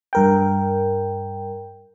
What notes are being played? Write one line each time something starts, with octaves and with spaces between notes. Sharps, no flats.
G2 A#4 G5